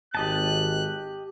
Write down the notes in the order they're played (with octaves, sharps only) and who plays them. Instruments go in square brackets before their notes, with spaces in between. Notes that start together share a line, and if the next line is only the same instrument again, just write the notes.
[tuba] G#1 [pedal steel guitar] G4 D#5 A5 [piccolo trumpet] F#6